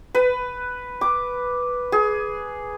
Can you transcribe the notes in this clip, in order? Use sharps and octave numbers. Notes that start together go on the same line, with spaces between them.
B4
D6
G#4